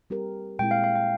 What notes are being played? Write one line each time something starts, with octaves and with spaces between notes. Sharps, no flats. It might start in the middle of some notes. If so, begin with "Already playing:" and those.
G3 C4 G4 A#4
A#2 G#3 C4 E4 G5
F5
F5
G5